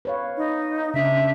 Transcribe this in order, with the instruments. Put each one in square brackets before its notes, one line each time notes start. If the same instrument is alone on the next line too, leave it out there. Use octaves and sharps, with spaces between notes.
[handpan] B4 C#5 F5
[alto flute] D#4
[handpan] C#3 D4 [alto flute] E5